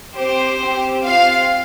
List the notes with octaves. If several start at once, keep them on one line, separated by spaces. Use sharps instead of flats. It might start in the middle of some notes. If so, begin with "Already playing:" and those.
C4 G4 C5
C4 G4
C4 F4 F5